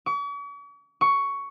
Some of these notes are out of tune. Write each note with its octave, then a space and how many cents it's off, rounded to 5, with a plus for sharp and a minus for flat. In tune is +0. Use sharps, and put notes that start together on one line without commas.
C#6 +45
C#6 +10